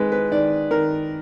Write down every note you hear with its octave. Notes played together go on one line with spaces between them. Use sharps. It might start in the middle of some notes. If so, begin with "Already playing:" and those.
Already playing: D#3 G#3 B4
B4
D#3 D5
D#3 A#4